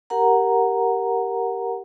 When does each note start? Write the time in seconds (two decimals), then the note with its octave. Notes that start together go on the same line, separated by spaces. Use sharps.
0.10 G4 A#4 F#5 A#5